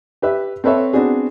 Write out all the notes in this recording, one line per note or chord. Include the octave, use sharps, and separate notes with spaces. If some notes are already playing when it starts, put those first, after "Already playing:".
G4 B4 E5
C4 A4 B4 C#5 E5
B3 C4 D4 F#4 G#4